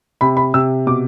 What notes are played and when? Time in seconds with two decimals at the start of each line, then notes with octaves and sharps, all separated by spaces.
0.21 C3 B5
0.37 B5
0.54 C3 E6
0.87 B2 D6